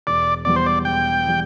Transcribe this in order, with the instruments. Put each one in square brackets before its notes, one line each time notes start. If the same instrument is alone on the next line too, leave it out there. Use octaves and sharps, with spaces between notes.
[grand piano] E1 [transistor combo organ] D5
[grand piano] E2 E3 G3 [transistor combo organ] D5
[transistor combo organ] C5
D5
[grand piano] E1 [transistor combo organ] G5
[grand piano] E3 G3